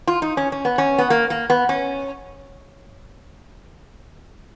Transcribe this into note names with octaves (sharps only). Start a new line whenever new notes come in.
F4
D#4
C#4
C#4
B3
C#4
B3
A#3
A#3
B3
C#4